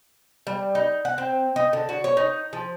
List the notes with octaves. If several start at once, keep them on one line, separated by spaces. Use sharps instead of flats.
G3
D#4
F#5
C4
D#4
D3
F#4
C#5
D#4
F3